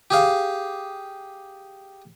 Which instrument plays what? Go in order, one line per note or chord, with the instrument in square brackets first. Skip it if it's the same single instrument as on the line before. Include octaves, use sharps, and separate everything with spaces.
[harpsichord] G4 G#4 F5